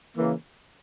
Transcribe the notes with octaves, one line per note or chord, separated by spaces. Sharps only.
C#3 E3 A#3